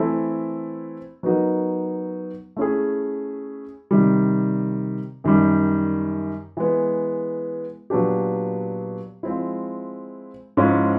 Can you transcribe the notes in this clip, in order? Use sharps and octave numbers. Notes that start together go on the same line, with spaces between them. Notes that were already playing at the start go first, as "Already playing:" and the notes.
Already playing: E3 A3 C4 E4 A4
F#3 B3 D#4 F#4 A#4
A3 C#4 E4 G#4
C3 D#3 G3
F#2 D#3 G3
E3 G#3 B3
A#2 F#3 B3 D4 G4
F3 G#3 C4 E4
G#2 F3 G#3 C#4 E4